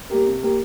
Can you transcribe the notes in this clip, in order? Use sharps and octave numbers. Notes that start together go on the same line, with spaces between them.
G3 A#3 G4 A#4
C3
G3 A#3 G4 A#4